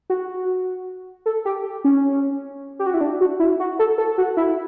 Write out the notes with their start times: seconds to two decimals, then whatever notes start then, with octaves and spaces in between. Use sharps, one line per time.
0.10 F#4
1.26 A4
1.45 G4
1.84 C#4
2.79 G4
2.86 F#4
2.94 E4
3.01 D4
3.21 F#4
3.40 E4
3.60 F#4
3.79 A4
3.98 A4
4.18 F#4
4.37 E4